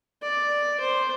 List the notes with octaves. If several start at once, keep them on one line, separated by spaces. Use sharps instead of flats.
D5
C5